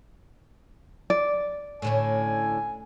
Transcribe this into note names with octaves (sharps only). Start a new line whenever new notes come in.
D5
A2 D3 C#4 G#5